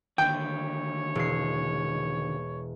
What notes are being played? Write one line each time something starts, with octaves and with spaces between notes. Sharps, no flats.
D#2 D3 C#5 G5
E1 C7